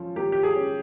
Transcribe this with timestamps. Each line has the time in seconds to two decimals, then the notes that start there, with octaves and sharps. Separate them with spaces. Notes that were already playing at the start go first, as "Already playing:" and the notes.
Already playing: F3 C#4
0.16 A#3 G4
0.32 G4
0.43 G#4
0.56 C#4